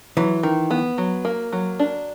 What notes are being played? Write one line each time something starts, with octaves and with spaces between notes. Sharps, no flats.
E3 F#3
D#3
B3
F#3
A#3
F#3
D4